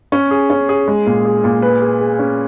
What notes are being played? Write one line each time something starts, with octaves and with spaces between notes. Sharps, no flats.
C#4
G#4
C#4
G#4
G#3
A#2
G#4
A#2
B4
G#4
G#4
C#4